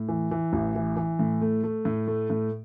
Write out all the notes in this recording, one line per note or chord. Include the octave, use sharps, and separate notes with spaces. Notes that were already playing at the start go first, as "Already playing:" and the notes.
Already playing: A2
E3
E3
A1
E3
E3
A2
A3
A3
A2
A3
A2